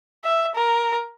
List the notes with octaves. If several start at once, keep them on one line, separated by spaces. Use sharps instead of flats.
E5
A#4